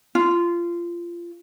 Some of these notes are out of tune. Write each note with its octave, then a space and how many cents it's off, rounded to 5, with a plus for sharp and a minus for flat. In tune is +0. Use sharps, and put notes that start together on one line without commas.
F4 -20